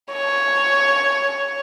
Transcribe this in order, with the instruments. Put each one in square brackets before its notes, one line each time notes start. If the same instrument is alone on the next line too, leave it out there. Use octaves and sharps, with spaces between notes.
[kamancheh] C#5